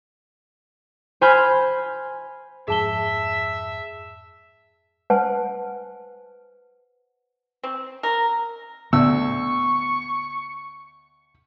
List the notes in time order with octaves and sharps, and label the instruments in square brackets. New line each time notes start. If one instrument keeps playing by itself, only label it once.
[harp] C5 G#5 B5 F6 G6
[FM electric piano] F2 G#2 [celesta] G#4 A5 G7 [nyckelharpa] E5
[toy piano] B4 C5 F#5 G#5 A5
[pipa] C4
A#4
[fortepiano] D2 E6 [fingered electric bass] B3 [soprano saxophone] C#6